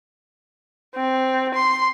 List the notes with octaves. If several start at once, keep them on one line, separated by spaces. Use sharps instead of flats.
C4
C6